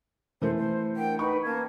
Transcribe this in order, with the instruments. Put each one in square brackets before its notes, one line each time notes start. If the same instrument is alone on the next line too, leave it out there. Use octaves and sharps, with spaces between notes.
[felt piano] E3 A3 [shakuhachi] C5
[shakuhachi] C5
[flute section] D4 A#4 F#5 [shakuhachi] G5
[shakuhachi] D#4 [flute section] B4 B5 [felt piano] C#6
[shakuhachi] A#3 [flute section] C#4 A5 G#6